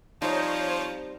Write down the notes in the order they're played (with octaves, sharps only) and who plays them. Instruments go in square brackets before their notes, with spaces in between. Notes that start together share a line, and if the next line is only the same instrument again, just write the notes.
[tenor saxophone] F3 [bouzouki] G3 A#3 C4 [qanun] D#4 [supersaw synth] C5 C#5